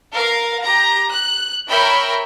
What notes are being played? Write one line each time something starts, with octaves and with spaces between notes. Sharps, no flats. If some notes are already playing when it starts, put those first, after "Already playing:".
A#4 F5
G4 A#5
F#6
A#4 C#5 E5 G5 B5